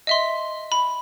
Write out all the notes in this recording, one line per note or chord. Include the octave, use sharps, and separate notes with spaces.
D#5 E5 C6
B5